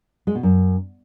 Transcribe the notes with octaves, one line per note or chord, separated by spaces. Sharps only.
G#3
B2
F#2